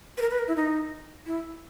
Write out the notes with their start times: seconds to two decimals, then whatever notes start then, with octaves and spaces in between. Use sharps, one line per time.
0.18 B4
0.22 A#4
0.30 B4
0.39 A#4
0.48 E4
0.56 D#4
1.26 E4